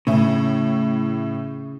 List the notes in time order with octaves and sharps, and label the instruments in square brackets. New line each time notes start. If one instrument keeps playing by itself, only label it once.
[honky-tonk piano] A2 E4 [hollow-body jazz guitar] C#3